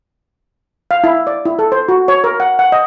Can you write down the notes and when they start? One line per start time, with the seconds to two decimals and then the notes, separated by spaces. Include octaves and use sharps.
0.91 F5
1.04 E4
1.27 D5
1.45 E4
1.59 A4
1.72 C5
1.89 F#4
2.08 C#5
2.24 A#4
2.40 F#5
2.59 F#5
2.72 D#5